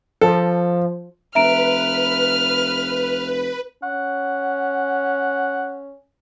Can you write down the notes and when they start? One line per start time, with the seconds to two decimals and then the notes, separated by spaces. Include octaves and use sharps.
0.21 F3 A4
1.35 F1 B4 E5 A#5 F6 D7
3.83 C#4 F#5